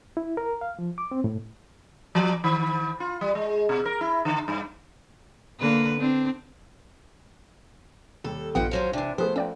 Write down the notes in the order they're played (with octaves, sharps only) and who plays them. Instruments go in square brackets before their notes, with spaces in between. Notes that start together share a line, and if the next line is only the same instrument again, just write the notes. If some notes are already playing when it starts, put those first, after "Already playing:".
[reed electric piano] E4
A#4
F5
F3
D6
C4
A2
[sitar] F3
D#3
F4
G3
G#3
B2
A#4
E4
D3
G2
[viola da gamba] D3 A#3 B4
C4 D4
[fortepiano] D#2 G3 [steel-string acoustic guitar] A4
[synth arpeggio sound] A#1 B3 [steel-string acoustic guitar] G2 F#5 G5 [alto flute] F4
[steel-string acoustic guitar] F3 F#3 C#4 [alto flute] C5
[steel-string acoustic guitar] C3 E3 [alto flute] D4
[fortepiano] F3 A3 [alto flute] B3 [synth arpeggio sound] G4 G#4 [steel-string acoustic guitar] C5
[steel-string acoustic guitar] F2 [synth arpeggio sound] C#4 D5 G5